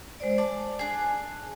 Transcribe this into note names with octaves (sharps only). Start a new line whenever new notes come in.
G#3 C5 D5
D5 A5
D4 G#4